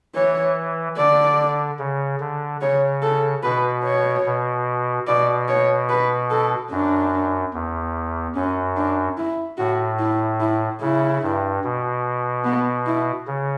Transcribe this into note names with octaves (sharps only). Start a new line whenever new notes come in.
E3 C#5
D3 D5
C#3
D3
C#3 C#5
A4
B2 B4
C#5
B2
B2 D5
C#5
B4
A4
F#2 D4
E2
F#2 C#4
D4
E4
A2 F#4
E4
E4
C#3 E4
G2
B2
B3
E4
C#3